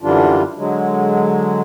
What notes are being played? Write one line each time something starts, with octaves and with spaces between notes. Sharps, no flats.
F#2 D3 E3 G3 D4 F4
D3 F#3 G#3